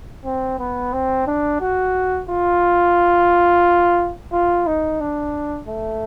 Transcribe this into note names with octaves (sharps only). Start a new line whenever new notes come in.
C4
B3
C4
D4
F#4
F4
F4
D#4
D4
A3